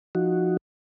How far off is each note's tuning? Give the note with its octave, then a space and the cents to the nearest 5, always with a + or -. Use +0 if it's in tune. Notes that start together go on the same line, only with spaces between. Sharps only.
F3 +0 D#4 +0 F#4 +0